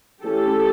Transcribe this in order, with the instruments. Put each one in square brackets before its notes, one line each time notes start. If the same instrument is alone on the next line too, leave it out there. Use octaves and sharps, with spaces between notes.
[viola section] E3 A3 C#4 G4 A4